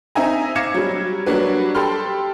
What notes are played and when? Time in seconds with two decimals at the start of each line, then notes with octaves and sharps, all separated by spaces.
0.15 C4 D#4 E5 G#5 A#5
0.56 F5 D6 G#6 A#6 C#7 E7
0.74 F#3 G3
1.26 F#3 G3 A#3 D4 F#4 B4
1.75 G4 A4 B5 C6 F6